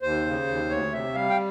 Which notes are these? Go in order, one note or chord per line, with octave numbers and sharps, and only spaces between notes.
D#2 C5
C#3
D#2
D2 C#5
C3 E5
G3 F5
G5